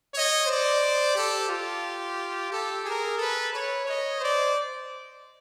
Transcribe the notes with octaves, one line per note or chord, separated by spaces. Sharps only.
C#5 D#5
C5 D5
G4 A4
F4 G4
G4 A4
G#4 A#4
A4 B4
B4 C#5
C#5 D#5
C5 D5